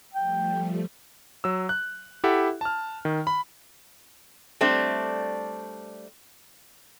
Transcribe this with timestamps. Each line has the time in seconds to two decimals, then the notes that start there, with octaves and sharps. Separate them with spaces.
0.14 F3 G3 A3 G5
1.44 F#3 E6
1.69 F#6
2.24 E4 G4 A4 E5 F#5
2.61 A5 F6
3.05 D#3
3.27 B5
4.61 G3 A3 C4 D4